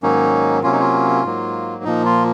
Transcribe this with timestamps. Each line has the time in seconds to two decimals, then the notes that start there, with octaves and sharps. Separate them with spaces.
0.03 G#2 D#3 F#3 A#3 C#4 D#4
0.63 C3 F#3 A#3 C#4 F4
0.72 D#4
0.80 F4
1.24 G#2 F#3 A#3
1.84 A#2 F3 A#3 D#4
2.05 F4